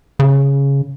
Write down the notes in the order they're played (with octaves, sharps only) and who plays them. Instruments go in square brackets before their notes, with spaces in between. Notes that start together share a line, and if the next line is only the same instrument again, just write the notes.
[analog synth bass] C#3